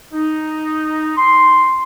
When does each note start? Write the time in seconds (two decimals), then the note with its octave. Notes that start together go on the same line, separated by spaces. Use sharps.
0.13 D#4
1.17 C6